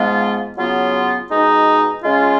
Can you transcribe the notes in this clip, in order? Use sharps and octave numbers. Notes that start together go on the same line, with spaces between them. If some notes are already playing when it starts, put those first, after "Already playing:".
Already playing: G#2 F3 G#3 B3 F4
C#3 F#3 B3 F4
B2 G#3 D#4
C#3 G#3 C#4 F4